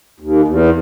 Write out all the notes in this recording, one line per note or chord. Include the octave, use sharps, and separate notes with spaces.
D#2
E2